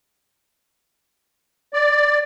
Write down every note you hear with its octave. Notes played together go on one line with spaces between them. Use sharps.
D5